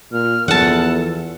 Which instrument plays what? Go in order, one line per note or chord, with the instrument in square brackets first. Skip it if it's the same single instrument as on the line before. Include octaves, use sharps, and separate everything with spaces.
[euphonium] A#2 [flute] F6
[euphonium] E2 [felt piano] E3 F3 [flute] A4 [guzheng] F#5 A5